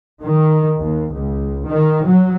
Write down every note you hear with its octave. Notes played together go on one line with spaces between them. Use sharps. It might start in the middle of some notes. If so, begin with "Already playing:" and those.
D#3
D#2
C#2
D#3
F#3